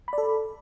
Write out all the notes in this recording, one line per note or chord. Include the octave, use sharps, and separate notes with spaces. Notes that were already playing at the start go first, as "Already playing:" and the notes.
A4 D5 B5